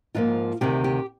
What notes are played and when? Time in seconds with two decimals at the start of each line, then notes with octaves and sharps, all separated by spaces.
0.15 G#2 F3 A#3 F4
0.61 D2 C3 D#3 G4
0.84 G4